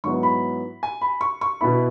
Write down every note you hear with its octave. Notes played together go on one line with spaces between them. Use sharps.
G#2 F#3 B3 E4 C#6
B5
G#5
B5
C#6
C#6
B2 B3 E4 B5